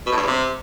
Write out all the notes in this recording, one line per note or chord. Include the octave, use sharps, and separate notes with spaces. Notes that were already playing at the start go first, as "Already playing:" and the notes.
B2
A2
G2
E2
C3